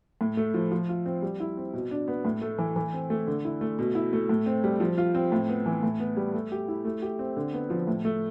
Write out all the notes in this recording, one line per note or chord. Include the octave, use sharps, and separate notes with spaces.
A2
A3
F3
F3
F4
C4
G3
E4
C4
B2
D4
B3
A2
A3
E3
E3
C4
A3
D3
E4
A3
B2
E4
A3
A2
C4
G3
F3
F4
C4
A2
B3
E3
A2
B3
G3
A3
G4
E4
A3
G4
C4
D3
B3
F3
A2
A3